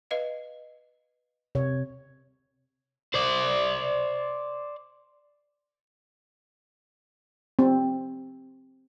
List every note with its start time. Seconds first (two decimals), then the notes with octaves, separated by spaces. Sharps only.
0.11 B4 D#5 F5
1.55 C3 C#5
3.14 C5 D5
7.59 C4